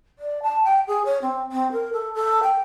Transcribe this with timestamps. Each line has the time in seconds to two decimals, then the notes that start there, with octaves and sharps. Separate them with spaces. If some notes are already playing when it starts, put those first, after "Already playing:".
0.19 D5
0.43 A5
0.64 G5
0.88 G#4
1.05 C#5
1.22 C4
1.52 C4
1.72 A#4
1.93 A4
2.14 A4
2.43 G5